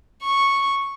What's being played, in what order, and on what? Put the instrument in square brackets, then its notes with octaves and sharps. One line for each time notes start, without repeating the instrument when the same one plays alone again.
[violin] C#6